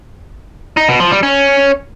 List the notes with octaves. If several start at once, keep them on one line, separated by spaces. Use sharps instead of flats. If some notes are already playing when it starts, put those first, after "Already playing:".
D#4
B2
F3
G3
C#4